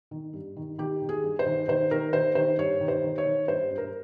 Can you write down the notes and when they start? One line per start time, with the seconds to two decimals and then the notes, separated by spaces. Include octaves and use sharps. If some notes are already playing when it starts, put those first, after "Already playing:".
0.11 D#3
0.33 G2
0.57 D#3
0.78 D#3 G4
1.02 D#3
1.09 G#4
1.24 G2
1.39 C5
1.46 D#3
1.68 D#3 C5
1.91 D#3 A#4
2.13 D#3 C5
2.35 D#3 C5
2.58 G2 C#5
2.81 D#3
2.88 C5
3.04 D#3
3.18 C#5
3.26 D#3
3.48 G2 C5
3.70 G2
3.78 A#4